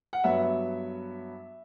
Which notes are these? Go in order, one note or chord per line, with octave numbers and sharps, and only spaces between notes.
F#5
G2 F#3 B3 E5